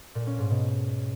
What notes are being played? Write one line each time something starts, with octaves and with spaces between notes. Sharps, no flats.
A#2
C#4
G#2
B2